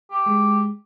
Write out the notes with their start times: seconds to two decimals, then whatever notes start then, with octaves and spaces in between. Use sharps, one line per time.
0.11 G4
0.26 G#3